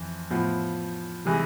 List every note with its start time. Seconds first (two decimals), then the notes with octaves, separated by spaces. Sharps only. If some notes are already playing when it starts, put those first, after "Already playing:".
Already playing: F2 E3
0.30 A2 F3 B3
1.25 C3 E3 G#3